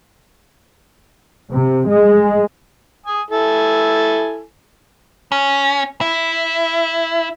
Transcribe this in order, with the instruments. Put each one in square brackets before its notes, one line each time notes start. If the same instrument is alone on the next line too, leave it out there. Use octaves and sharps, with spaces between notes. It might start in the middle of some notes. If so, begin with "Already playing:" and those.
[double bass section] C3
G#3
[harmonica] G#5 D#6
E4 A4 G#5
[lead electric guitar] C#4
E4